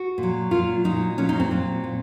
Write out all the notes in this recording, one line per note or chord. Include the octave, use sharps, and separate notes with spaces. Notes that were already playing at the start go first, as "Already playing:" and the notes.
Already playing: F#4
A#2
F#3
A#2 F#3 F4
A#2 F#3 D#4
A#2 F#3 C#4
D#4
C4
A#2 F#3
A#2